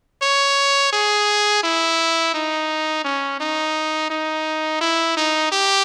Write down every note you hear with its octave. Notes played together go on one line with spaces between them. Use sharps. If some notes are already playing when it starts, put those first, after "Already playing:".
C#5
G#4
E4
D#4
C#4
D#4
D#4
E4
D#4
G4